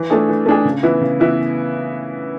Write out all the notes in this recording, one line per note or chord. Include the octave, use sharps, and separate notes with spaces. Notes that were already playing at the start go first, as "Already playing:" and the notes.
Already playing: E3
A3 D4 G#4
E3
A3 D4 G#4
C#3
E3 B3 E4
C#3
E3 B3 E4